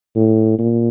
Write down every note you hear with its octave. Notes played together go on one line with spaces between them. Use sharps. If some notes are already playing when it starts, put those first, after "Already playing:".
A2
A#2